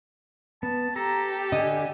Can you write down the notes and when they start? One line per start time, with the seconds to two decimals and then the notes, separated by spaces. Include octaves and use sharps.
0.63 B3 A5
0.96 G4 A4 A#5
1.52 D3 D#5 G#5